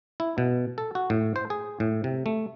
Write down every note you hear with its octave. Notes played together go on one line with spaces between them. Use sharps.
E4
B2
A4
F#4
A2
C5
G#4
A2
C3
A3